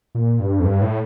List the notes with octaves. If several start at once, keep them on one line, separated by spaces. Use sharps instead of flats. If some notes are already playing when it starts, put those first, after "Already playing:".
A#2
G2
F2
G2
A2